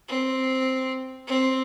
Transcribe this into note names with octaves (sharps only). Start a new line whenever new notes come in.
C4
C4